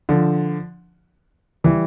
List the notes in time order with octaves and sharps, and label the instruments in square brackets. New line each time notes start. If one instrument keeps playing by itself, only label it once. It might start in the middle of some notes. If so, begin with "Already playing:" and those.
[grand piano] D3 F3
E3 G3